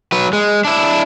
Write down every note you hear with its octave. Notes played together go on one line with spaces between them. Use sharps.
F#3 B4
G#3
D4 E4